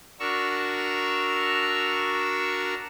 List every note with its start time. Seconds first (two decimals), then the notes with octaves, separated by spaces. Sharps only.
0.20 D4 F#4 A#4 A#5 C#6 E6